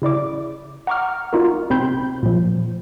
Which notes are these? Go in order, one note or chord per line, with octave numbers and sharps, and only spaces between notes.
C#3 E4 D5 D6
F#5 A#5 C#6 D6 F6
D#4 F4 F#4 A#4
C3 C4 B5 C6 G6
A#2 F3